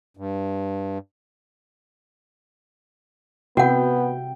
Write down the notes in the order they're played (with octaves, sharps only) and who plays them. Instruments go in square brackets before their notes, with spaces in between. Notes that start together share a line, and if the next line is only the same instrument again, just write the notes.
[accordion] G2
[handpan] C3 E5 [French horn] B3 [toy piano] F#4 F#5 [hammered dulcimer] G5